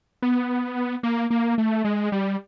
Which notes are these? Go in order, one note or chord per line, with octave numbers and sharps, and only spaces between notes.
B3
A#3
A#3
A3
G#3
G3